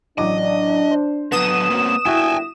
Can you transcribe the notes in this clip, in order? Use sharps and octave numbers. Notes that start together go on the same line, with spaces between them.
A1 F#3 D4 D#5 D6
C5
D3 F#3 B3 D#6 E7
F#2 F#3 A#3 C4
G1 A#2 E4 F#4 G5 G#5